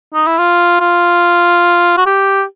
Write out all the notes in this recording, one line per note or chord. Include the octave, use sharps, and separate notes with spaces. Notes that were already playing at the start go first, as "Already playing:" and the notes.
D#4
E4
F4
F4
F#4
G4